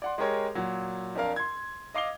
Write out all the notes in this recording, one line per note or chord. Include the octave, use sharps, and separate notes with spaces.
D5 F#5 C6
G#3 G4 G#4 A#4 C#5
A#2 F#3
F2 D4 A#4 F5
C6 G#6
D#5 F5 D6 C7 F7 G7